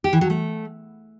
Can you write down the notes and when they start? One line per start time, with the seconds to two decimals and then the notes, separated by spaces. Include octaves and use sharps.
0.04 G4
0.13 E3
0.21 F#3
0.30 A3